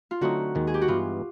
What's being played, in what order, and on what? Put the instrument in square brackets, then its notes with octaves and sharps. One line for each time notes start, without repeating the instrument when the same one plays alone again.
[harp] F4
[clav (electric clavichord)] D3 F#3 A3 C4 D#4 [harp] F#4
[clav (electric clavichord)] D#2 D#3 G#3
[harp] G#4
G4
F#4
[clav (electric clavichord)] G2 E3 G#3 B3 [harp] F4